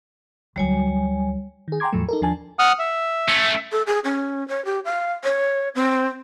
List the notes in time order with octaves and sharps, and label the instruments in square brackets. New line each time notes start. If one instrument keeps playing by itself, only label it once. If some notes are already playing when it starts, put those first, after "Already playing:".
[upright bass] D2 F#3 [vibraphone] G3 C#5 G#5
[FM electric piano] D#3 G#4
G5 G#5 A#5 C6 D6 G#6
E2 A2 F3 F#3 A3
D#4 A4 A#4
D#2 F3 D4 G#5 A5
[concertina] F#5 D#6 F6
E5
[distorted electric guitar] A3 C#4
[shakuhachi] A4
G#4
C#4
C#5
G4
F5
C#5
C4